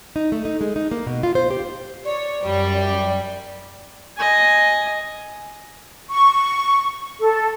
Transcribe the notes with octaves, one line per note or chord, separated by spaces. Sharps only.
D#4
A3
D#4
G#3
D#4
A#3
B2
F4
C5
G4
C#5 D5
F#2 G3
D#5 G#5
C#6
A4